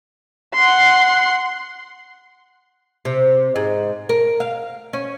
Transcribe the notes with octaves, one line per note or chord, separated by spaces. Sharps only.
F#5 C6
C3
G#2
A#4
F5
C#4